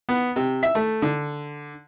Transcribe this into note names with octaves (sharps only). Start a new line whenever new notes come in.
B3
C3
E5
A3
D3